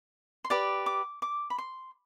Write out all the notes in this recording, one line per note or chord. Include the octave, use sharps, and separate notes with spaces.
C6
G4 B4 D5 D6
D6
D6
B5
C6